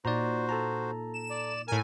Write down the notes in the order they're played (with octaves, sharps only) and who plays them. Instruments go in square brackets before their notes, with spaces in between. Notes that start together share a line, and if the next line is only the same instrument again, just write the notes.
[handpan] A#2 D#4 [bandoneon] F#4 C5 [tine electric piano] D5 A#5
[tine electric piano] A4 A5 A#5
[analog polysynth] E7
[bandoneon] D5
[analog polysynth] A2 G#5 [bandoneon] A#4